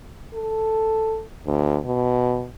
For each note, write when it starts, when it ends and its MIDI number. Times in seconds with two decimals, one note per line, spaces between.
0.34 1.22 69
1.46 1.78 38
1.85 2.47 47